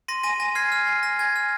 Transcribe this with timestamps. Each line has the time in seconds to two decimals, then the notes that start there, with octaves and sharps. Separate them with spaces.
0.08 C6 A#6 D#7
0.23 G#5 A#6 D#7
0.40 G#5 A#6
0.55 F6 G#6 C7
0.72 F6
0.87 G#5
1.03 F6 A#6
1.19 G#5 G#6
1.36 F6